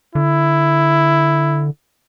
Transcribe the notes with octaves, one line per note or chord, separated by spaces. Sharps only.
D3 E4